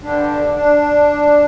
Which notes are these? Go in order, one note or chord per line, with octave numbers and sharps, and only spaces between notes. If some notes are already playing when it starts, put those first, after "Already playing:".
G2 D3 G3 D4
D4